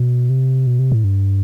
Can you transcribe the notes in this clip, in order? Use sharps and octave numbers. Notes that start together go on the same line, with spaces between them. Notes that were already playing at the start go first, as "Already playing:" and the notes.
Already playing: B2
C3
B2
C3
A2
G2